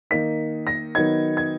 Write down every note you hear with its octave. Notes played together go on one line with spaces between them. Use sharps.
D#3 A#3 D#4 B6
A#6
D#3 F#3 B3 D#4 G#6
G#6